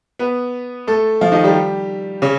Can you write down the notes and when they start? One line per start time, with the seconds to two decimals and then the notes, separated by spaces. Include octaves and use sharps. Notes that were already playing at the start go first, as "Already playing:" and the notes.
0.19 B3 B4
0.87 A3 A4
1.21 F3 F4
1.32 D#3 D#4
1.44 G3 G4
2.22 C#3 C#4